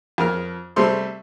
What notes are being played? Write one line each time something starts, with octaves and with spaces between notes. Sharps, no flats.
F2 A#4 F6
C3 G3 A3 C6